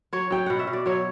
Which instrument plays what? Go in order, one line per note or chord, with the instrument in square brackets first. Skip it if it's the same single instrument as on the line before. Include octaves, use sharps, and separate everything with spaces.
[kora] F#3 C#5
F#3 G5
B2 F#5
E5
B2
D5
F#3 C#5